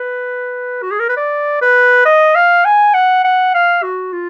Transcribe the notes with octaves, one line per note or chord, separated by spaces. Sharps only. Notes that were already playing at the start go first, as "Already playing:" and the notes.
Already playing: B4
F#4
G#4
A#4
B4
D5
B4
D#5
F5
G#5
F#5
F#5
F5
F#4
F4